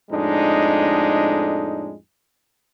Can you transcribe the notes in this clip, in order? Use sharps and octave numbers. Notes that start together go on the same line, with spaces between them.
F2 A2 G#3 D4 D#4